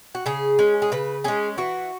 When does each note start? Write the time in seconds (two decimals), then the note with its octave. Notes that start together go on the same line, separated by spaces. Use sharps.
0.15 F#4
0.26 C#3 G#4
0.59 G#3 C#4
0.82 G#4
0.92 C#3 B4
1.24 G#3 C#4 G#4
1.57 E3 F#4